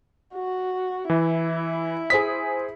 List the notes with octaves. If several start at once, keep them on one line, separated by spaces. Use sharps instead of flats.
F#4
E3 E4
G#4 C5 D#6 B6